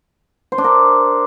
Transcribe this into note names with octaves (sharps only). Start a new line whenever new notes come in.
C5
D4
A#4